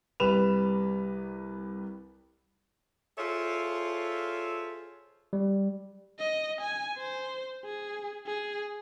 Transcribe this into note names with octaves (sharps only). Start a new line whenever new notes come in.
C2 G3 B4 E7 F7
F4 G#4 A4 C5 C#5 E5
G3
D#5
G#5
C5
G#4
G#4